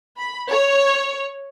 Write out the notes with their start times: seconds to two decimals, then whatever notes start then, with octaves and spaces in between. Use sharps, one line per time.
0.17 B5
0.49 C#5